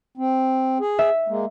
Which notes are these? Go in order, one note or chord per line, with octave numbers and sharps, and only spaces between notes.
C4
G#4
E5
G#3 A#3